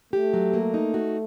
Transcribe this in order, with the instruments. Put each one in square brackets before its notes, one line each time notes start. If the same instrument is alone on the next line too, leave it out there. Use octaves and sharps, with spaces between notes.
[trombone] A3 [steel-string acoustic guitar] G4
[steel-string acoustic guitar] F#3
A#3
D#4
F#4